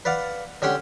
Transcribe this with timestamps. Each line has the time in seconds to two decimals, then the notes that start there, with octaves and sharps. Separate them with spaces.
0.05 B4 D5 F5 F#5
0.62 D3 C#4 G4 F#5 G5 C6